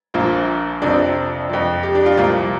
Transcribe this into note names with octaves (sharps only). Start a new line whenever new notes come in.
A#1 A#2 F3 F4
F2 C3 F3 D4
F2 F3
G4
D4
F4
C2 A#2 F3 F4